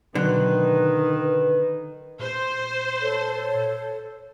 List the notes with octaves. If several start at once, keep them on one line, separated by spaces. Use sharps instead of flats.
B2 D3 D#3 F#3 B4 F#6
A#2 C5
A4 C#5